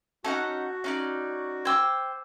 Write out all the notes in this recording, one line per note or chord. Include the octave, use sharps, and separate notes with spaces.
C#4 D#4 F#4 A4 F#5
C#4 D#4 D5
C5 G5 D6 E6 G#6